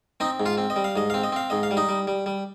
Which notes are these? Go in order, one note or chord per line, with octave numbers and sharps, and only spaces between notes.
C4 D#4 D#5
G#2
F4 F5
C4
D#5
G3
F5
G#2 D#5
C4 F5
D#5
C4 F5
G#2 D#5
F5
G3
D#4 D#5
G3
G3
G3